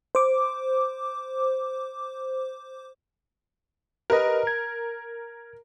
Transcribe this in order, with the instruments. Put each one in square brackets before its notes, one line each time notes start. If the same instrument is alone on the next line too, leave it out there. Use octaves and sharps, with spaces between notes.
[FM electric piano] C5 D6
[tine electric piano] G4 B4 D#5 [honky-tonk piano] A#4
[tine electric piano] G#6